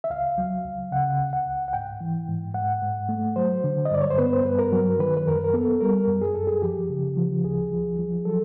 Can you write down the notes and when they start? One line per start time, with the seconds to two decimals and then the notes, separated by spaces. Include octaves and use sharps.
0.04 E5
0.10 C#2 F5
0.38 F#3
0.65 C#2
0.92 C#3 F#5
1.18 C#2
1.33 F#5
1.46 C#2
1.68 F#5
1.73 G#2 G5
2.01 E3
2.28 G#2
2.54 G#2 F#5
2.82 G#2
3.09 A3
3.36 F#3 C5
3.64 D3
3.85 D#5
3.91 G2 D5
4.01 C#5
4.10 C5
4.18 B3 B4
4.33 C5
4.45 G2 B4
4.59 A#4
4.72 F#3
4.99 D#3 B4
5.17 B4
5.27 F#2 A#4
5.44 A#4
5.53 B3 A4
5.81 G3 A#4
6.08 F#2
6.21 G#4
6.35 F#2 A4
6.47 G#4
6.62 F3 G4
6.89 C#3
7.17 F3
7.44 D2 G#4
7.72 F3
7.99 F3
8.25 F#3 A4